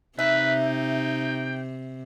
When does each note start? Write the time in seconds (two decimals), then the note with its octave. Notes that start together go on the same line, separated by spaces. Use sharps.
0.19 C3 D#4 B4 E5
0.65 G5